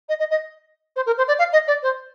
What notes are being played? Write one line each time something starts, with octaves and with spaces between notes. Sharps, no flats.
D#5
D#5
D#5
C5
A#4
C5
D5
F5
D#5
D5
C5